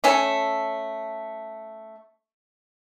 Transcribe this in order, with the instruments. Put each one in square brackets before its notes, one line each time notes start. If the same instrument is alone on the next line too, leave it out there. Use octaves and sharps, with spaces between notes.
[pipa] A3 C#4 A4 G#5